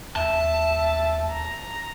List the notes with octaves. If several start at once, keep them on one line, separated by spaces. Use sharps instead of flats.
D#2 E5 A5
A#5